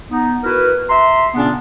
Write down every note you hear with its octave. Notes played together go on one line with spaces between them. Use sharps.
B3 D#4
E4 F#4 A#4 B4
E5 A#5 C6
A#2 C#3 B3 C#4 D4